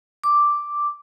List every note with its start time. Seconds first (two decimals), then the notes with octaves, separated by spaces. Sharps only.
0.24 D6